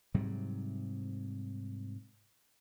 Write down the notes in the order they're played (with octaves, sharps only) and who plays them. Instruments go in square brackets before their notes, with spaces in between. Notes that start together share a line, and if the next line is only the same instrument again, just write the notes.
[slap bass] G#2 C3 F#3 G3